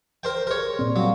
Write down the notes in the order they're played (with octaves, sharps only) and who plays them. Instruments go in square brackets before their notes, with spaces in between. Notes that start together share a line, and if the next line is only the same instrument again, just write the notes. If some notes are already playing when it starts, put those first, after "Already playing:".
[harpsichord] A#4 C5 G5
[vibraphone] G4 G#4 C6 [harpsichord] A#4 C#5
[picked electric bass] A#2 C4 [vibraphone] D5
[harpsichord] F#3 [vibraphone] G3 F5 C#6